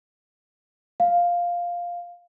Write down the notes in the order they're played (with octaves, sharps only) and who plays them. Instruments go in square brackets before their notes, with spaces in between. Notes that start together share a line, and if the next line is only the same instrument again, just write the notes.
[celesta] F5